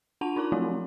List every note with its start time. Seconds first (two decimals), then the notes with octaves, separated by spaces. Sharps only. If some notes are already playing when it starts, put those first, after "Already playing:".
0.21 D4 F4 F#5 A5 D#7 F7
0.36 D#4 F4 A#4 A#5 D6
0.52 F3 F#3 A3 C4 E4 F#4